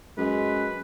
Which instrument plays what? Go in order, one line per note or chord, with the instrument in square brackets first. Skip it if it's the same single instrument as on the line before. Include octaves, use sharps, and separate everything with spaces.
[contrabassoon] F#2 [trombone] G#3 [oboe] B4